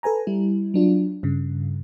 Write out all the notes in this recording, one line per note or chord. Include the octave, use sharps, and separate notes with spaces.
A4 B4 G#5 A#5
G3 E4
F#3 D4 F4
G2 C#3